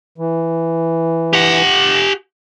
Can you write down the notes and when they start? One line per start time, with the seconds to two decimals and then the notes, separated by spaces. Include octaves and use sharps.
0.18 E3
1.33 G4 F#5